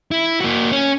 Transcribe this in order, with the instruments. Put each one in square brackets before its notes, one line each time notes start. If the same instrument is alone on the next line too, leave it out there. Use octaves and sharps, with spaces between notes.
[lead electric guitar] E4
A#3 F#4
C#4